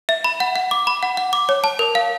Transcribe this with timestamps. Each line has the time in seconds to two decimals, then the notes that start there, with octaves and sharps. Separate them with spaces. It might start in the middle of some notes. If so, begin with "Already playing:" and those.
0.09 E5
0.24 B5
0.40 F#5
0.56 F#5
0.71 D6
0.87 B5
1.03 F#5
1.17 F#5
1.33 D6
1.49 C#5
1.64 A5
1.79 A#4
1.95 F5